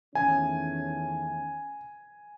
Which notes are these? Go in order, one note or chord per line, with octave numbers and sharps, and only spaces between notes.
E2 D#3 A3 C#4 G#5